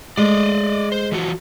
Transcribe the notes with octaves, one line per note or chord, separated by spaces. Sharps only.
G#3 A3 D5 D#5
C5
E3 F3 F#4